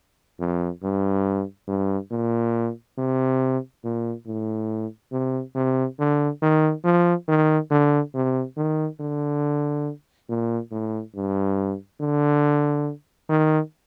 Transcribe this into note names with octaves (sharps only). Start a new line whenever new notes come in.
F2
G2
G2
A#2
C3
A#2
A2
C3
C3
D3
D#3
F3
D#3
D3
C3
D#3
D3
A#2
A2
G2
D3
D#3